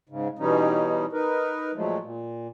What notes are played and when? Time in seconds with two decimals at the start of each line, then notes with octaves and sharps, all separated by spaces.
0.09 G#2 C#3
0.39 B2 E3 G3 C#4 D#4
1.13 D#4 A#4 B4
1.75 A#2 F3 F#3 G#3 A3
2.01 A#2